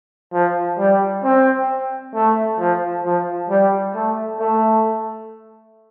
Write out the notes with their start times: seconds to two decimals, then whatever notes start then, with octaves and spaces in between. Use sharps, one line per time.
0.33 F3
0.78 G3
1.24 C4
2.14 A3
2.59 F3
3.05 F3
3.50 G3
3.95 A3
4.40 A3